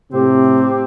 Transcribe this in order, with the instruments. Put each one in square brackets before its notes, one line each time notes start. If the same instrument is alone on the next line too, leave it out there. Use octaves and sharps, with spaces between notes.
[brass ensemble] A2 C3 [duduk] C4 [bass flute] G4